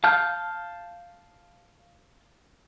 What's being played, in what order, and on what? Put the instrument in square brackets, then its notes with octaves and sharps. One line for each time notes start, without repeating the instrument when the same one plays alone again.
[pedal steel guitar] F5 A5 F6 G6